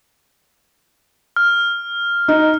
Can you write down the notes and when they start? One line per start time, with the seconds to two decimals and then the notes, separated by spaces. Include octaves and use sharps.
1.36 F6
2.28 D#4